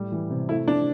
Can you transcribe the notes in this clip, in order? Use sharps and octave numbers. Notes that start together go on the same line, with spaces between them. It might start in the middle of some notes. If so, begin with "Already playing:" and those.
Already playing: A2 G3
E3
C3
A3 E4
F3 D4